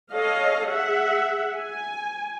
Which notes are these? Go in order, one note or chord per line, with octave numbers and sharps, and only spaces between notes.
A4 C#5 D#5 F5
G#4 E5 F#5
G#5